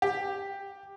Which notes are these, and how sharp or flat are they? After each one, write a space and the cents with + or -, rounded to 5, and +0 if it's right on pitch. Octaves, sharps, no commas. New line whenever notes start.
G4 +5